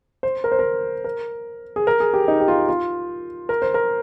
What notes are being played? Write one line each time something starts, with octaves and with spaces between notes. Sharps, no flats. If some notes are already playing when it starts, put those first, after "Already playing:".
C5
A#4
C5
A#4
A#4
G#4
A#4
G#4
G4
D#4
G4
F4
F4
A#4
C5
A#4